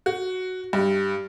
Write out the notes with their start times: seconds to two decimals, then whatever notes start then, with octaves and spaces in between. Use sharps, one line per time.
0.06 F#4
0.73 G2